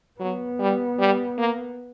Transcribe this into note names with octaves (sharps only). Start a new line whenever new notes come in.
F#3 B3
G3
G3
A#3